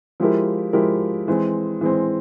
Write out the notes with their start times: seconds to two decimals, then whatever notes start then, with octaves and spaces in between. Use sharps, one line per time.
0.20 F3 G#3 E4 G4 A#4
0.73 F3 G#3 E4 G4 A#4
1.28 E3 G#3 C4
1.81 E3 G#3 C4